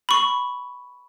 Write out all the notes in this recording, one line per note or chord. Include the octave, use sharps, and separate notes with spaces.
B5 C#6